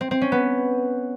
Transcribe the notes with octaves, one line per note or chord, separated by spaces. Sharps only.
C4
C4
C#4
B3